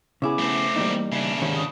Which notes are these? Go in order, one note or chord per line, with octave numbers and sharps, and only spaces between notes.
C#3 B3 E4 G#4 D6
A3 C4
E2 G3 A#3 D#4
C#3 D4 E5
G#2 C3 D#3 C#5
D#6